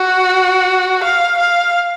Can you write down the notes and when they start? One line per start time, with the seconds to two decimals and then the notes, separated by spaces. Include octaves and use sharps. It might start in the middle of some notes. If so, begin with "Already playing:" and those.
Already playing: F#4
1.04 F5
1.38 F5